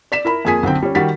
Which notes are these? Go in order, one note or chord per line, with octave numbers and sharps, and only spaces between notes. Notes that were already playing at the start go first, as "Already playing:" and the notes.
D5 B6 E7
E4 A#4 B5
F2 A#3 G#4 G#5 B6
B1 D3 C4 G5
G3 C#4
D#3 G3 F#4 A6 B6